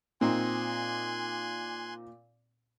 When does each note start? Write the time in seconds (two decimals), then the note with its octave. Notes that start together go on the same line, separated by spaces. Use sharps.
0.21 A#2 C4 D#4 G#5 C6 F#6